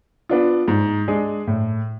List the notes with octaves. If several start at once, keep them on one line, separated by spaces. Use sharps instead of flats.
B3 D4 F4
G#2
G#3 D4 G#4
A2